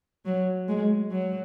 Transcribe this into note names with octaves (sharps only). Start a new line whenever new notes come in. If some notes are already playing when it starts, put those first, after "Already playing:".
F#3
G#3
F#3